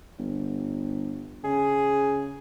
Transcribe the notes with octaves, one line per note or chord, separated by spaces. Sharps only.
G1
C#3 G#4